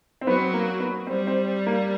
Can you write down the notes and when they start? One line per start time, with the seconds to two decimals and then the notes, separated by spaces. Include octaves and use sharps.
0.21 C4
0.27 F#3 B3
0.54 A#3
0.80 B3
1.07 G3 C4
1.27 C4
1.67 A#3